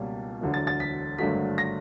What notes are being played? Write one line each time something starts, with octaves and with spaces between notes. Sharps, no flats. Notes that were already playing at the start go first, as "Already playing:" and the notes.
Already playing: C#2 B2 G3 A#3 C#4
E1 D2 D3 F#3
A6
A6
B6
G#1 G2 D3 F#3 A3 B6
A#6